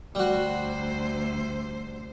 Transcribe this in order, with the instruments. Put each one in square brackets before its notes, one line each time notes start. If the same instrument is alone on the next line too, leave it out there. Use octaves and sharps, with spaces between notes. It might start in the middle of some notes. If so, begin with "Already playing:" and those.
[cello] D2 C5 [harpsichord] G3 F#4